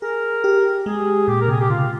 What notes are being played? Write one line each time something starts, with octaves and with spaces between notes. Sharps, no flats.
G#4 A#4
G4
G#3 G#4
A#2 G4
A#4
C3 G#4
G4
C#3 F4